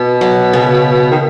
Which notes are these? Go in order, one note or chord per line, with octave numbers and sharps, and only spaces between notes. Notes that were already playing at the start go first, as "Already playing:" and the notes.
Already playing: B2
F#3
C#3
D#3